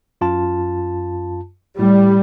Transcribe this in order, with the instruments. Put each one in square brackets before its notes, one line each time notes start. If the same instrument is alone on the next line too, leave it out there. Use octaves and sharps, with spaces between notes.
[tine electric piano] F#2 F4 A5
[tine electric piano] A2 [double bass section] G3